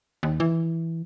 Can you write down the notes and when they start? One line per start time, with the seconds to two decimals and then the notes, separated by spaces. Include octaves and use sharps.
0.23 D#2
0.40 E3